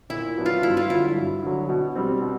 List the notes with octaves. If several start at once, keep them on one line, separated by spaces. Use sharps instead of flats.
A#2 E4
F#3 B3 D4
F4
G2 E4
F4
D3 F#3 E4
G2
D3 F#3
B2
G3 C4
B2